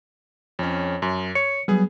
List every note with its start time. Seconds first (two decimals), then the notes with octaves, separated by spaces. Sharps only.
0.59 F2 C#4 C#5
1.02 F#2
1.35 C#5 C#7
1.68 F#3 G3 B3 G#4